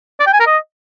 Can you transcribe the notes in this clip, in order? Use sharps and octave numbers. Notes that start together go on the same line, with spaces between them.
D5
G5
G#5
A#4
D#5